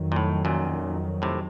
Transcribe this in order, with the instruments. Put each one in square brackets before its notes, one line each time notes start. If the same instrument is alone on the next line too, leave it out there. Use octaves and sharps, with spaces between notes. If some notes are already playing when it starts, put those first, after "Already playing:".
Already playing: [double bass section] F2 D#3 F#3
[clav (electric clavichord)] A#2
A2
F#2 A#2
A2 C3